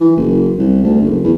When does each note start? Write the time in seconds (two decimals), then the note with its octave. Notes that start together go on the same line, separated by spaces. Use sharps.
0.01 E3
0.17 F#1
0.59 C2
0.84 D2
1.02 F#1
1.24 E2